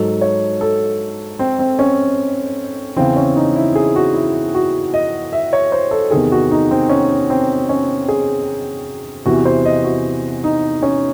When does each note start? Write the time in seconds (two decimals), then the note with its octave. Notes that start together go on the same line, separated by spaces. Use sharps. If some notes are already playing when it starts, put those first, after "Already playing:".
Already playing: G#2 F#3 A4
0.21 C#5
0.61 A4
1.39 C4
1.59 C4
1.79 C#4
2.96 E2 C#3 E3 C4
3.16 C#4
3.36 D#4
3.56 E4
3.75 G#4
3.96 F#4
4.14 E4
4.55 F#4
4.94 D#5
5.33 E5
5.53 C#5
5.72 C5
5.91 A4
6.11 E2 C3 D#3 G#4
6.32 F#4
6.51 D#4
6.71 C4
6.89 C#4
7.30 C4
7.69 C#4
8.08 G#4
9.26 E2 C3 E3 F#4
9.45 C5
9.65 D#5
9.84 F#4
10.44 D#4
10.82 C#4